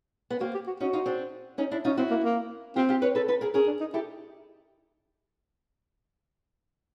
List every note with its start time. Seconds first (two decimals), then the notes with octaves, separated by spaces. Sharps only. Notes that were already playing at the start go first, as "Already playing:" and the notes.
0.30 B3
0.40 A#3 C4 F#4
0.54 G4
0.67 F#4
0.80 C#4 D#4 F#4
0.93 D#4 F4
1.06 C4 D4
1.58 C#4 D#4
1.71 D4 E4
1.85 C#4 D#4 F4
1.97 C4 E4 F#4
2.11 A#3
2.24 A#3
2.76 C4 F4 G4
2.89 F4 G4
3.02 B4 C#5
3.15 A4 B4
3.28 A4 B4
3.41 G#4 A#4
3.54 C#4 G#4 A#4
3.67 D4
3.80 D#4
3.94 E4 G4 A4